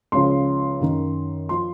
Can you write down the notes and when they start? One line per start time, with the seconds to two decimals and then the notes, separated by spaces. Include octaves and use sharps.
0.12 C#2 C#3 F3 C6
0.81 F#2 D#3
1.49 F3 C6